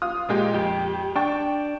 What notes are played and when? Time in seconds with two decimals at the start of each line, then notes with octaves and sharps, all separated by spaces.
0.02 F4 D#6
0.29 A#2 G#3 G4
0.54 F2 G4
1.16 D4 G5 C#6 A6